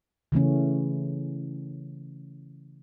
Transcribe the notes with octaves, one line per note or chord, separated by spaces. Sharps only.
C#3 E3 A3 C#4